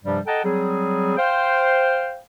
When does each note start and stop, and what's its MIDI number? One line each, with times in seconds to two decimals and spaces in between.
0.04 0.19 43
0.04 0.19 48
0.04 0.19 53
0.04 0.19 55
0.26 0.40 69
0.26 0.40 75
0.26 0.40 78
0.26 0.40 79
0.26 0.40 81
0.26 0.40 82
0.43 1.14 54
0.43 1.14 55
0.43 1.14 60
0.43 1.14 68
1.17 2.19 72
1.17 2.19 77
1.17 2.19 79